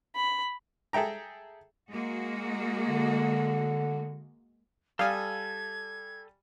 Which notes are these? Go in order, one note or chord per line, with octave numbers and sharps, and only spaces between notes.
B5
G#4 A4 E5 G5 A#5
G#3 A#3 F#4
D3
G3 A4 F5 G#5 D#6 G#6